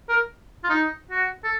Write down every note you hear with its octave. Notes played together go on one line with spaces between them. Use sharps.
A#4
F4
D#4
F#4
A4